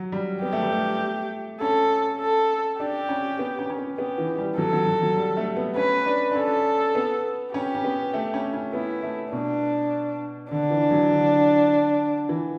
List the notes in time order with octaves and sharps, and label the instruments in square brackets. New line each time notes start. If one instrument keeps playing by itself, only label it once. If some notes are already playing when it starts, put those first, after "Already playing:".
Already playing: [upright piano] F#3
G3
[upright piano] B3 [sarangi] G4
[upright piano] A3
G3
A3
[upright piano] C#4 [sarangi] A4
[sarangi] A4
[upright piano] D4 [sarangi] G4
[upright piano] C#4
B3
C#4
C#4
B3
[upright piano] B3 [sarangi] G4
[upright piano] E3
G3
[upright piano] F#3 [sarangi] A4
[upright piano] F#3
F#3
F#3
G3
A3
B3
[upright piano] C#4 [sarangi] B4
[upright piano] D4
D4
[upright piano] C#4 [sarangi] A4
[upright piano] B3
[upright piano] C#4 [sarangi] G4
[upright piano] C#4
B3
A3
C#4
C#4
[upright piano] B3 [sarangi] E4
[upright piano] A3
[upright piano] B2 [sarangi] D4
[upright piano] D3 [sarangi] D4
[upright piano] E3
F#3
D3
E3